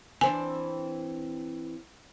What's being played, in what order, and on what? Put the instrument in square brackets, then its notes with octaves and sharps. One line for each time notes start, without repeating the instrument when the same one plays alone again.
[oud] E3 C4 D4 [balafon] G#5